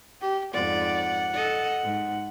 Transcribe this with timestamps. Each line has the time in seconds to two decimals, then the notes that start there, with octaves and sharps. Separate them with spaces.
0.21 G4
0.54 F2 G#2 D5 F#5
1.34 A4 D#5
1.84 G#2